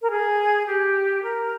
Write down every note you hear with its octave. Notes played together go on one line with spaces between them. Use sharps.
A#4
G#4
G4
A#4